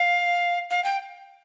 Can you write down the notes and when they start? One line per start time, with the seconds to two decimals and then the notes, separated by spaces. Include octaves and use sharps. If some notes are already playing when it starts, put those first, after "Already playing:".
Already playing: F5
0.71 F5
0.84 G5